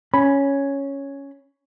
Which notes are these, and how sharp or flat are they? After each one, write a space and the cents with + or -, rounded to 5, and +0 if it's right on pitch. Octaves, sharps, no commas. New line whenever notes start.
C#4 +0 B5 +0